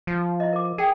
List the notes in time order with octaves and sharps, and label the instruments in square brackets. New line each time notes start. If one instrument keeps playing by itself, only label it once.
[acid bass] F3
[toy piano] E4 D#5
A#4 D6
A#4
[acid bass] G#4 [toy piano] A#4 G5